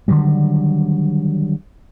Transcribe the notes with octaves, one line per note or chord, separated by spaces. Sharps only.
D3 D#3 F#3 G3